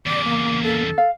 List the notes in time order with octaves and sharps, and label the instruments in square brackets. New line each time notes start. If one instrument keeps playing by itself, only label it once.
[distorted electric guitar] E2 C#3 [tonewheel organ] D5 [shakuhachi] D6
[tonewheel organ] A#3
[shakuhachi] A4
[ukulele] F5